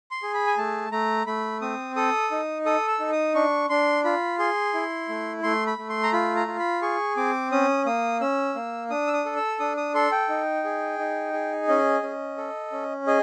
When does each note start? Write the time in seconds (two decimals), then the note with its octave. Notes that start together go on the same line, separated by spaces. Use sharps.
0.11 C6
0.23 G#4
0.34 B5
0.47 G#5
0.58 A3 A5
0.92 A3 A#5
1.26 A3 B5
1.62 C4 D#6
1.96 A4 D#6
2.31 D#4
2.66 A4 D#6
2.88 E6
3.00 D#4
3.12 D#6
3.35 D4 C#6
3.69 D4 C6
4.04 F4 B5
4.39 G#4 C6
4.74 E4
5.09 A3
5.43 A3 C6
5.67 B5
5.78 A3
5.89 C6
6.03 A#5
6.13 F4 B5
6.36 A#5
6.48 F4
6.59 B5
6.82 G#4 C#6
7.17 C4 D6
7.52 C#4 D#6
7.86 A#3 D#6
8.21 C#4 E6
8.56 A#3
8.90 D4 D#6
9.07 E6
9.13 D#6
9.26 A4
9.36 E6
9.60 D4 D#6
9.77 D#6
9.94 A4 C6
10.12 G5
10.29 D#4
10.64 G#4
10.99 D#4
11.33 G#4
11.68 C#4 D#5
12.03 C#4
12.38 A4
12.72 C#4
13.07 G#4 D#5